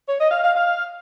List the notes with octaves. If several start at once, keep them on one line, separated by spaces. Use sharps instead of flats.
C#5
D#5
F5
F5
F5